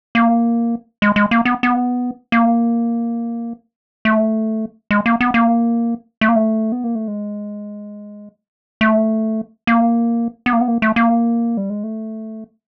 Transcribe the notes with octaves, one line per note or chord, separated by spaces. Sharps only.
A#3
G#3
G#3
A#3
B3
B3
A#3
A3
G#3
A#3
B3
A#3
A3
A#3
A3
B3
A#3
A3
G#3
A3
A#3
B3
A#3
B3
A#3
A3
A#3
G3
G#3
A3